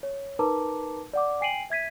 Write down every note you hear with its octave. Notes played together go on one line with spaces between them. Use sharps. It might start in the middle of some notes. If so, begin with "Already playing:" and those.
C#5
D#4 A#4 B4 A5 A#5 D6
D5 F#5 D6
G5 G#5 C7 D7 D#7 F#7
E5 G#6 B6 D#7